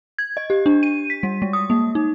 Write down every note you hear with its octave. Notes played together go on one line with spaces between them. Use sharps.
G#6
D#5
G4
D4
D#7
B6
G3
G#3
D#6
A#3
D#4